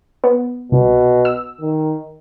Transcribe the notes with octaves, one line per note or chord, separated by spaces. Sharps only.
B3
C2 B2
E6
D#3